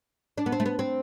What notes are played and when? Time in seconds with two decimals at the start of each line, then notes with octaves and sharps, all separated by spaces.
0.38 D4
0.46 B3
0.52 C4
0.60 A3
0.66 B3
0.79 C4